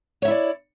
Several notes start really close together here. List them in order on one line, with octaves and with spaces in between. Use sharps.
C#5 E5 E4 D5